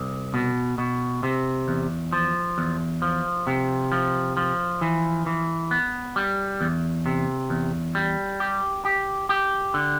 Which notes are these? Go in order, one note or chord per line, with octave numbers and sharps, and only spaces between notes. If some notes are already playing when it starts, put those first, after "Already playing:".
Already playing: C2
B2
B2
C3
E2
F3
E2
F3
C3
F3
F3
E3
E3
B3
G3
E2
C3
E2
G3
G4
G4
G4
D3